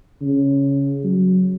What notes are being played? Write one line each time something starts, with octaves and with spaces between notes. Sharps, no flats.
C#3
F#3